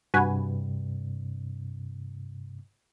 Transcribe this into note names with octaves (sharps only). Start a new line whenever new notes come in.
G2 C3 F#4 B4 G#5